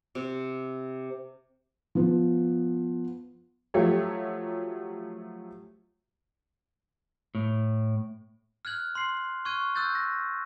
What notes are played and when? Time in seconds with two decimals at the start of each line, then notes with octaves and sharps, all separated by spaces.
0.15 C3
1.95 F3 B3
3.74 F3 F#3 A3 G4 C#5
7.35 A2
8.65 F6 F#6 G#6 F#7
8.95 C6 C7
9.45 C#6 F6 F#6 G#6 D#7
9.75 E6 F#6 G6 A6
9.95 A#6